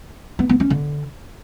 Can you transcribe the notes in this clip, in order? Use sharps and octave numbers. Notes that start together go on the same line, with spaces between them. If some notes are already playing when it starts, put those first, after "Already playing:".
B3
B3
C#4
D3